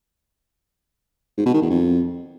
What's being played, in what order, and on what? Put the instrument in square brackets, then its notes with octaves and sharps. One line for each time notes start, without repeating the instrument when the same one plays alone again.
[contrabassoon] G#2
B2
D#3
E2
F2